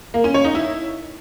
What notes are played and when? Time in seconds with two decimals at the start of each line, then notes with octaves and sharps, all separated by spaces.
0.14 A#3
0.24 C#4
0.34 C#5
0.45 D#4
0.55 E4